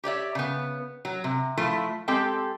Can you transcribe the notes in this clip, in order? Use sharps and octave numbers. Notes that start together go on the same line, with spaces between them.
G4 C#5 D5 E5
C#3 B3
F#3
C3
F3 A3 E4 F4
G#3 C4 G4 A4 G5